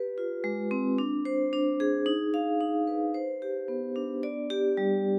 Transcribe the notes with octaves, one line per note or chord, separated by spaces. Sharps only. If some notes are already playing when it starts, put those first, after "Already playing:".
Already playing: G4 B4
F4
G#3
C4
D4
C5
D4
G#4
D#4
F5
D#4
B4
C5
G4
B3
D4
D5
G4
G3